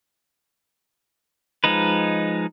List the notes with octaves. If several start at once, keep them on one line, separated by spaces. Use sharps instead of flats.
F3 G#3 D#4 B4